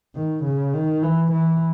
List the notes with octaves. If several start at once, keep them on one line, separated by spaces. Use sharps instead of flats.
D#3
C#3
D#3
E3
E3